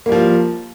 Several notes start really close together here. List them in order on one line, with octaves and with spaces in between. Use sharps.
A#3 G3 F3